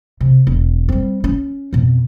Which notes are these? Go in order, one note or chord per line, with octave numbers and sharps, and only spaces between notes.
C3
E1
G3 C4
C#4
F2 B2